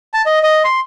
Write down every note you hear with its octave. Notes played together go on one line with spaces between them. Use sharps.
A5
D#5
D#5
C6